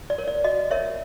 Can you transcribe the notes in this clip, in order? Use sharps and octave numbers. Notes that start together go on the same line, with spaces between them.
D5
A#4 C#5
D5
F#4 D#5
A#4 C#5 E5